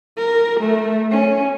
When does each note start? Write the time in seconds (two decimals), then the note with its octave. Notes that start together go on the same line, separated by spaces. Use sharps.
0.18 A#4
0.61 A3
1.11 C#4